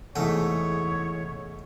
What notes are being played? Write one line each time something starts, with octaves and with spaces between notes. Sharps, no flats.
E2 G#2 C3 E3 A3 E4 C#5